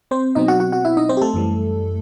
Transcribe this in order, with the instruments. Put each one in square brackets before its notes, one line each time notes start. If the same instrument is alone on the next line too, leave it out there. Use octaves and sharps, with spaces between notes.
[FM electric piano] C4 C5
B2 F#3 C4 D#4 D#5
F#4 F#5
F#4 F#5
F#4 F#5
E4 E5
D#4 D#5
C4 C5
G4
A3 A4
F#2 E3 G3